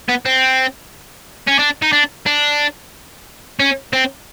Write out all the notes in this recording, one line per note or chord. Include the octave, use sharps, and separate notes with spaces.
B3
C4
C#4
D4
D#4
D4
D4
C#4
C4